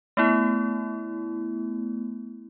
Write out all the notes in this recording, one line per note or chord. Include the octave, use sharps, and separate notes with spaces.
A3 B3 E4